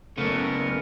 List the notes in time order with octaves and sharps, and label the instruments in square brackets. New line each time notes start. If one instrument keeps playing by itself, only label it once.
[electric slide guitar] F#2 C#3 [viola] A3 [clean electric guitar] B3 [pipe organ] A#4